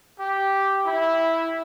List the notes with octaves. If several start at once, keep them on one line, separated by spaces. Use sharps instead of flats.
G4
E4